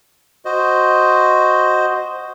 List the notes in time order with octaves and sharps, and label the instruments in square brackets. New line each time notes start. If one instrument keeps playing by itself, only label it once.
[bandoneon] F#4 C5 D#5